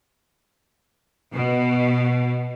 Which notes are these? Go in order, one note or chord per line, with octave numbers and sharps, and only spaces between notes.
B2